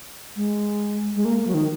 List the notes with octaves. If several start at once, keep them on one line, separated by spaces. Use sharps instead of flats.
G#3
G#3
A#3
A#3
F#3
D#3